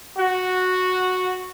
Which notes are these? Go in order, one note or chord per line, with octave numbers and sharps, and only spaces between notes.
F#4